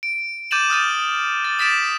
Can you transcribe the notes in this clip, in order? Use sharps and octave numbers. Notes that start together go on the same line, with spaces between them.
D7
D6 G6 A6 D#7 E7 F#7
D#6 F6 A6 D#7
A6
D#6 A6 B6 D7 E7